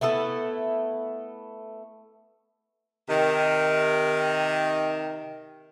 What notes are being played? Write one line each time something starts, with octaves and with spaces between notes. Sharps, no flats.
A3 B3 E4 A4
C3 D#3